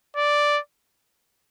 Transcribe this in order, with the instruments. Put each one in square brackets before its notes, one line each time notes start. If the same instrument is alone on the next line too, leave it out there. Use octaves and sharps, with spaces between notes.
[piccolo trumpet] D5